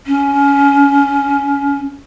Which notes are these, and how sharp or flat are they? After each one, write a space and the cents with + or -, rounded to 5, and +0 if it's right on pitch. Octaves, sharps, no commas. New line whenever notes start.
C#4 +20